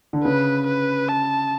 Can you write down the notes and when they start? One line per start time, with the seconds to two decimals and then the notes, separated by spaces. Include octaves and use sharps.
0.13 D3
0.24 C#3 B4
0.67 B4
1.09 A5